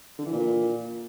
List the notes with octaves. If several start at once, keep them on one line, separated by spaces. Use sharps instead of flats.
D3
E3
A#2